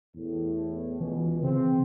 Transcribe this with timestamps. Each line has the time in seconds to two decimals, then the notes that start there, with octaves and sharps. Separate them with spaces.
0.15 E2 A2
1.00 C#2 B2 E3
1.43 C#3 C4